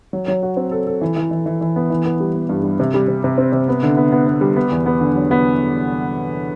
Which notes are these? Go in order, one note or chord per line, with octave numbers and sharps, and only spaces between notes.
F#3
F#3
F#4
C4
A4
A4
E3
E3
E3
E3
E3
B3
E3
B3
G3
B3
G2
G3
C3
G3
C3
C3
C4
C3
B3
D3
B3
B3
B3
G3
B3
E2
B3
D3
F#3
B3